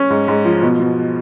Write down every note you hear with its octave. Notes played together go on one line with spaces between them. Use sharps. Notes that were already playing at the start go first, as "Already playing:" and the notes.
Already playing: C#4
G#2
G#2
F3
B2
B2